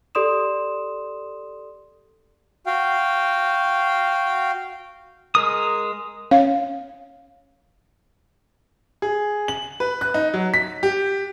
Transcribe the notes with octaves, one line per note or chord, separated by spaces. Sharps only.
G4 A4 D5 C6 D#6 E7
F#4 F5 G5
G#3 A#4 D#6
C#4 F5
G#4
F#7
B4
F#6
D#4
F#3
B6
G4